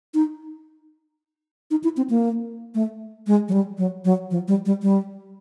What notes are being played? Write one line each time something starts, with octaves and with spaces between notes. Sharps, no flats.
D#4
D#4
E4
C4
A#3
A3
G#3
F#3
G3
F#3
F#3
F3
G3
G3
G3